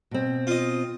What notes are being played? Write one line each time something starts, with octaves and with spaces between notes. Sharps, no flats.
B2 C4
F4 D#5